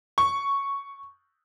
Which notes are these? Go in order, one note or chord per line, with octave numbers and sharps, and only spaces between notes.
C#6